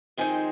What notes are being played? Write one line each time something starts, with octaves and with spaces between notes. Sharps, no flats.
F2 D#3 G#3 C4 D#4 G#5